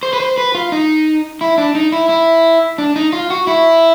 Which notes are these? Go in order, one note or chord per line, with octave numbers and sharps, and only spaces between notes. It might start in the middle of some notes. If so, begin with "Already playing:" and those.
C5
B4
C5
B4
F4
D#4
E4
D4
D#4
E4
E4
D4
D#4
F4
F#4
E4